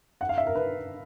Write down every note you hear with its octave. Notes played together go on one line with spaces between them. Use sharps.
F#5
F5
E5
A#4
B4